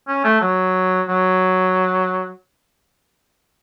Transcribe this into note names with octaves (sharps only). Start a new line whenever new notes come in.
C#4
A3
F#3
F#3